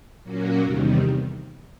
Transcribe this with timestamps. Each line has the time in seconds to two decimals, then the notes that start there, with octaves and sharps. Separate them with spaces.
0.23 A#2 F#3 A#3 C#4 F#4
0.60 E2 C3 D#3 G3